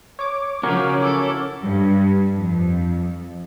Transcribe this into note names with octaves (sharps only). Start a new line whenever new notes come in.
C#5 D6
C#3 F3 F#3 C#4 F#4 A#4
E4 A4
G2
F2